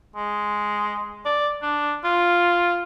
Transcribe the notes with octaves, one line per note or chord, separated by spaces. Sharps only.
G#3
D5
D4
F4